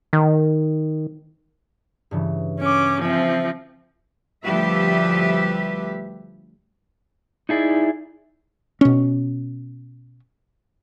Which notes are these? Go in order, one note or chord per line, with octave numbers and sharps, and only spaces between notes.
D#3
G2 C#3 E3
C#4 D6
F3 C4 E5 G#5
D2 F3 G3 G4 B4 E5
D#4 E4 G#4 D5 E5
B2 C#4